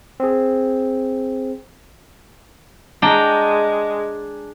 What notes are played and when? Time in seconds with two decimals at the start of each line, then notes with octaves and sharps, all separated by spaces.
0.20 C4 G#4
3.02 G#3 D4 G5 A#5